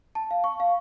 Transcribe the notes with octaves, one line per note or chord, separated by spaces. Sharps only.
A5
F5
C#6
F5